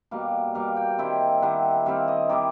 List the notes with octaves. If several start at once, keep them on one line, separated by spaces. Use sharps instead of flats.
B2 G3 A#3 F5
B2 G3 A#3 F5
G5
D#3 G3 C4 E4 G5
D#3 G3 C4 E4 F#5
D#3 G3 C4 E4 F5
D#5
D#3 G3 C4 E4 D5